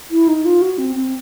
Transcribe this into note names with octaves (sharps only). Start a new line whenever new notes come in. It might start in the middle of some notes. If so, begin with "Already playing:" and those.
E4
D#4
F4
F#4
C4
C4